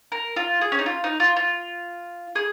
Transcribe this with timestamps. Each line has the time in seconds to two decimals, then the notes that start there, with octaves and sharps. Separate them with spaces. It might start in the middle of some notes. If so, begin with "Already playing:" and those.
0.12 A#4
0.36 F4
0.61 G#4
0.72 C#4
0.79 D#4
0.86 F4
1.04 D#4
1.20 F4
1.36 F4
2.35 G#4